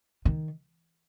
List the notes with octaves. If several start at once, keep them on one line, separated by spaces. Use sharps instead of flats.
D#3